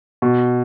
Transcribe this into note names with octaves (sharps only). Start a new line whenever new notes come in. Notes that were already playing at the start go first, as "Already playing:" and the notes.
B2